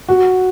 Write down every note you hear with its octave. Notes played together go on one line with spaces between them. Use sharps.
F#4